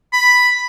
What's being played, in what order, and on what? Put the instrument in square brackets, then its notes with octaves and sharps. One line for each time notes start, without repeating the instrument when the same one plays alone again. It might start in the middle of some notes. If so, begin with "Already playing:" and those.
[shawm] B5